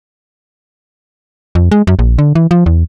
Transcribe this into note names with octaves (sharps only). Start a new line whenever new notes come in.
F2
G#3
F#2
A#1
D3
E3
F3
E2